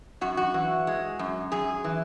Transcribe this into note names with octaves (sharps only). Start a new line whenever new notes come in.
F#2 F#4
F#4
E3
G#3
F#2
F#2 G#4
E3